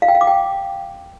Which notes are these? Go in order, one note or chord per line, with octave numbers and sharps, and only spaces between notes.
F5
G5
F5
D6
G5